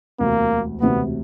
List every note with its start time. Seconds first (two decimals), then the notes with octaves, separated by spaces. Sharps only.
0.19 E1 D2 C3 A#3
0.81 E1 D2 C3 B3